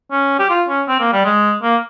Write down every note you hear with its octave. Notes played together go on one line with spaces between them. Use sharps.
C#4
G4
F4
C#4
C4
A#3
G3
G#3
A#3